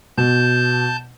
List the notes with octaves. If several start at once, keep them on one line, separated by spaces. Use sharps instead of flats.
B2 A5 G6